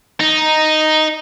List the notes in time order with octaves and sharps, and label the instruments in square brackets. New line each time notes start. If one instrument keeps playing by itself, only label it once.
[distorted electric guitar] D#4